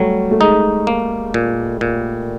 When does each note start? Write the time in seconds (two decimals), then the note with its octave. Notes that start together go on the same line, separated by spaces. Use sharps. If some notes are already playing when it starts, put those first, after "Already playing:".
Already playing: F#3 G3 A3
0.31 A3
0.40 G#3 D#4
0.87 A#3
1.34 A#2
1.81 A#2